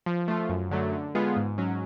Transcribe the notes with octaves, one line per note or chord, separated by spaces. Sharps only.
F3
A3 F4
F#2
D3 F#3 A3
D3
G#3 B3 F4 G#4
G#2
F#3 C#4